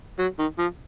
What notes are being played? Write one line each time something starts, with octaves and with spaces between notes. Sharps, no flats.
F#3
D#3
F3